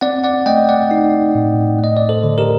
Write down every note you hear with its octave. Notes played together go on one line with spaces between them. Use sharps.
C4 D5 F#5
D5 F#5
A3 D#5 G5
D5 F#5
D#4
A2
A3
D#5
D5
A4 C5
D3
G4 A#4